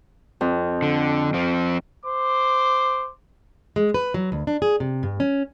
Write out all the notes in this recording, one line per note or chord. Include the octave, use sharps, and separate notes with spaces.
F2
D3
F3 C4
C5 D6
G#3
B4
F#3
D2
D4
G#4
C3
G2
C#4